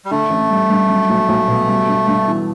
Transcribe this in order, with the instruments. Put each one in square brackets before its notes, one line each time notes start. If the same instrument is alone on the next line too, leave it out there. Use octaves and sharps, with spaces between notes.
[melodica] G3
[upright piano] D3 [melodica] A3
[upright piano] A1
G3
G2
F#3
B1
B1
B2
G3
G2
G2
E3